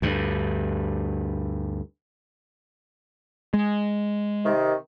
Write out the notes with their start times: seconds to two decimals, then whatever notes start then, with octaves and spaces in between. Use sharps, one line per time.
0.02 D2 G2
3.54 G#3
4.45 C3 D#3